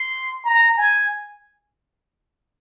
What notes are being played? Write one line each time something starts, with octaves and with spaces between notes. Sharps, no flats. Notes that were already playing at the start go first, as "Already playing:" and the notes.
Already playing: C6
A#5
G#5